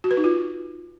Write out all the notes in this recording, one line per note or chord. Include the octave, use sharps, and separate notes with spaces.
F#4
B4
D#4
F4